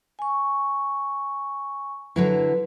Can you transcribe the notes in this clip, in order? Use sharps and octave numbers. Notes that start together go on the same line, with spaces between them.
G#5 C#6
D3 F#3 E4 B4